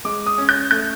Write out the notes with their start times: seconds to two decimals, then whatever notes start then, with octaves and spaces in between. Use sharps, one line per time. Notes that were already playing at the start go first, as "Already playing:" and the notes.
0.05 G#3 D6
0.26 D#6
0.38 C#4
0.49 G6
0.71 A3 G6